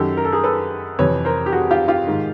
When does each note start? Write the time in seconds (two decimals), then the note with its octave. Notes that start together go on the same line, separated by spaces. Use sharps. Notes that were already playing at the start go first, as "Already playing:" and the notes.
Already playing: F#2 D#3 G4 A4
0.17 A#4
0.25 A4
0.32 G#4 A#4
0.44 A4 B4
0.99 F2 C3 E3 B4 C#5
1.25 A#4 C5
1.46 G4
1.52 F#4 G#4
1.71 F4 G4
1.88 F4 G4
2.07 G#2 D#3